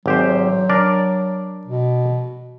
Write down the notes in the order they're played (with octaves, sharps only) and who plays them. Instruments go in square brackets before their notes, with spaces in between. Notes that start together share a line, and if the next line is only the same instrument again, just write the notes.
[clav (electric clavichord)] G#1 G4 C5 [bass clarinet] F#3
[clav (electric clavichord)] D4 A#4 D5
[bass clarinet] B2